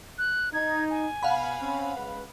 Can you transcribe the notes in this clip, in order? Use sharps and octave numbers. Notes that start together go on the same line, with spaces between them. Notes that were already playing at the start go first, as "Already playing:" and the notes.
F#6
D#4 G#6
G#5
B2 F5 F#5 B5
C4 C#4
C#2 B4